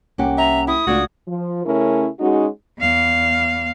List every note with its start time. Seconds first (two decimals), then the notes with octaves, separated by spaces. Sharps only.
0.18 C2 A#3 C#4 G4 F#5
0.38 E5 A#5
0.67 E4 D#6
0.87 C#2 A3 D4 F4 F#4 G#6
1.28 F3
1.66 C#3 A3 C#4 E4 A#4
2.20 G#3 C#4 D#4 F#4
2.79 E2 F5